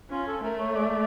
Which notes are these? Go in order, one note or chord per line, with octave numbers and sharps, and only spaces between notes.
C#4 F4
A4
A3 A#4
C#5
D5